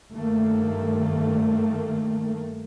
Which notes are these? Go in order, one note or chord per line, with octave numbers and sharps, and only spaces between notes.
G2 D#3 A3 A#3